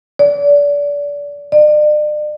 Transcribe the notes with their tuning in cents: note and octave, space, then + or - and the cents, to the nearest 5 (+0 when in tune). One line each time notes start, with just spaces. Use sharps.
D5 -30
D5 +40